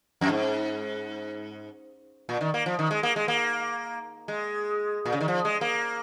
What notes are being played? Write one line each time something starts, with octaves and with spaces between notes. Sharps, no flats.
F2
G#2
A#2
D#3
A#3
F3
D#3
G#3
A#3
G#3
A#3
G#3
A#2
C#3
D#3
F3
G#3
A#3